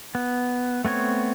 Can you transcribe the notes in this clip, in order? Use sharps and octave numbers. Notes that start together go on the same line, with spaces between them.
B3
A3 B3 C4 C#5